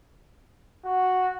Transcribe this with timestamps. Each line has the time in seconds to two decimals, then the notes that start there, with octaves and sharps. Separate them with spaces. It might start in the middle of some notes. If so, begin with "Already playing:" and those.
0.85 F#4